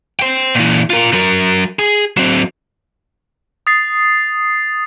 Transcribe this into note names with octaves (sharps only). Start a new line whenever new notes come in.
C5 G5
A#2 E3
F4 A#4
F#3 A#4
G#4
F#3 C4
D#6 A6 C7